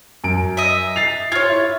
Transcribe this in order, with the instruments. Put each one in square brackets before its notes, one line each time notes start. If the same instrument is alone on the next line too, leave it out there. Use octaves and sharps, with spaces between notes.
[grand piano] F#2 D7
[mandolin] D#5 E5
[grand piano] A6 C7 F7
[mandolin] F4 C#5 [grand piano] F6 G#6
[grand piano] E4